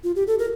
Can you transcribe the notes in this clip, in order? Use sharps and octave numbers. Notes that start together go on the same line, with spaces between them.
F4
G4
A4
A#4